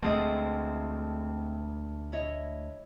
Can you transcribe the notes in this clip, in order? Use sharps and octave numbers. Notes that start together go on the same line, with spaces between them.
D2 G#3 A3 C4 G#4 D#5
E4 C#5 D#5